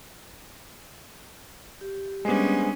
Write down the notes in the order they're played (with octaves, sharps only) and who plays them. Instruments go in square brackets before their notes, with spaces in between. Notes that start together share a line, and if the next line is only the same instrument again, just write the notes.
[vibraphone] G4
[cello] G3 C#4 [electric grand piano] G#3 B3 [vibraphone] D4 C5 G#5